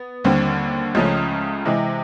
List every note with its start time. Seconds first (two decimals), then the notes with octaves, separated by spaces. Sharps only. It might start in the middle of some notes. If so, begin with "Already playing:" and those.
Already playing: B3
0.24 D#2 D3 G3 C4
0.95 C#2 C#3 F3 A3 C#4
1.65 C3 E3 G#3